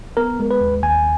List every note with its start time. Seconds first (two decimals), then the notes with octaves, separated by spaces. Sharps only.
0.17 B3 A#4
0.40 G#3
0.51 B4
0.61 D#2
0.83 D#2 G#5